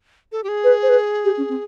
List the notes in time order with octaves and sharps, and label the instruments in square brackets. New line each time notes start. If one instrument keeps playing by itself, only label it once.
[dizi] A4
G4
G#4
[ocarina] B4
C5
B4
G4
C#4
C4